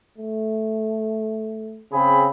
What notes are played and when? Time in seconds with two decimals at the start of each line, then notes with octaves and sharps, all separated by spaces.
0.18 A3
1.93 C#3 C4 G#4 B5